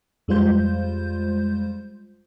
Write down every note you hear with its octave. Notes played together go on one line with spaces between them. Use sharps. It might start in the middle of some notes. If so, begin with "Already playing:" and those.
F2 G3 G#3 F4 C5 G6